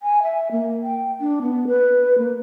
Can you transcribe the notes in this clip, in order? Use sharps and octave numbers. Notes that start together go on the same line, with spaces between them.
G#5
E5
A#3
G5
D4
B3
B4
A#3